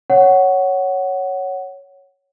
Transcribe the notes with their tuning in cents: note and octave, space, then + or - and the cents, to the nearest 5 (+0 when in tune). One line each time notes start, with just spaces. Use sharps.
C#5 +0 F#5 +10